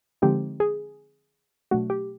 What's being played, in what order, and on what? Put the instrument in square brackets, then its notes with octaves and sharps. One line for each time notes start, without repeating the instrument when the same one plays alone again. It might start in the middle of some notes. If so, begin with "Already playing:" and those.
[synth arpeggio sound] D3 F3 G#3 C4 D#4 G4
G#4
B2 F#3 A3 D4 F#4
G4